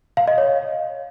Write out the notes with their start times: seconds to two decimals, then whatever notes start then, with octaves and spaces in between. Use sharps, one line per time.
0.17 F5
0.27 D#5
0.38 C#5